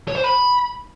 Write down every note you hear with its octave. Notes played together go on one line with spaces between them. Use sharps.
C#5
C5
B5